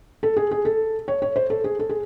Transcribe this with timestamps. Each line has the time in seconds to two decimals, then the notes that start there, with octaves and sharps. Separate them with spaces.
0.23 A4
0.37 G#4
0.51 G#4
0.65 A4
1.08 C#5
1.22 C#5
1.36 C5
1.50 A4
1.64 G#4
1.79 A4
1.89 G#4